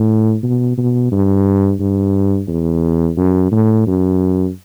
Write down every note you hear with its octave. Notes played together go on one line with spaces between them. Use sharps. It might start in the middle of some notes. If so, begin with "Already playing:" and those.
Already playing: A2
B2
B2
G2
G2
E2
F#2
A2
F#2